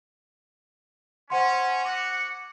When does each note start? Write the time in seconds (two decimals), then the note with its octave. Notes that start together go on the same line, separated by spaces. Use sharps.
1.30 C#4 C5 F#5 C6
1.85 F#4 F#5 D6